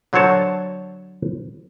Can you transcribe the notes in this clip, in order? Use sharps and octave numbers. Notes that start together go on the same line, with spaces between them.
D3 F#3 C5 C#5 A5